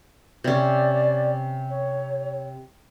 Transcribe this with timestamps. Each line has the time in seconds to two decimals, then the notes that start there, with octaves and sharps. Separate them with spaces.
0.44 C3 C#4 D5
1.69 C#5